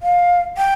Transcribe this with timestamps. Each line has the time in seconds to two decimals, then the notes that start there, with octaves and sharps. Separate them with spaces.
0.02 F5
0.58 G5